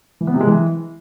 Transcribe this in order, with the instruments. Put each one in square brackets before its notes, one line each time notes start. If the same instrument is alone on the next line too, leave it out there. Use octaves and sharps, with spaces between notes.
[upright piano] E3
B3
C3
G#3
E3